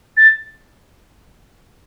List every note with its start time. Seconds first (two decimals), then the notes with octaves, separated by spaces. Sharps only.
0.17 A6